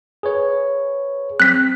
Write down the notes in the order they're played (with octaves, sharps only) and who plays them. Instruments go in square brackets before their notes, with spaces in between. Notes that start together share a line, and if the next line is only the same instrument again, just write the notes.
[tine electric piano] G#4 B4 C#5
[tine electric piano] C4 [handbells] F#6 B6